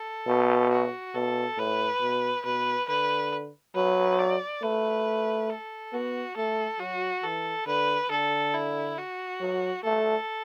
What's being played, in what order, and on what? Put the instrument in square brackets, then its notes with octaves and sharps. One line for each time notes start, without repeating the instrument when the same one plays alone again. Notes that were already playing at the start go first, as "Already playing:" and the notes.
Already playing: [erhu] A4
[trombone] B2
[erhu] F#4
[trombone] B2 [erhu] A4
[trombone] A2 [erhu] B4
[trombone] B2
[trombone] B2 [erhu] B4
[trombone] D3 [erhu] B4
[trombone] F#3 [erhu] B4
[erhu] D5
[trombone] A3 [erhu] B4
[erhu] A4
[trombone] B3 [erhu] F#4
[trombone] A3 [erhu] A4
[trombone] F#3 [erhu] F#4
[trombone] E3 [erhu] A4
[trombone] D3 [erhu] B4
[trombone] D3 [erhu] A4
[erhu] E4
F#4
[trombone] F#3
[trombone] A3 [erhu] A4